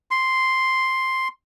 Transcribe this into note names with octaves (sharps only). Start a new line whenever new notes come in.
C6